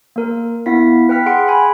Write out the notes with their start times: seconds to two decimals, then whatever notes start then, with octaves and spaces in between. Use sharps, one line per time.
0.16 A#3 A#4
0.66 B3 E4 F5 B6
1.09 B4 G5 F6 B6
1.26 G#4 F#5 C6 C#7 D7
1.48 G#5 B5